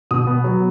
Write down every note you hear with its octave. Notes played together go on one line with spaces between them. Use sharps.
B2 D#6
B3
F#3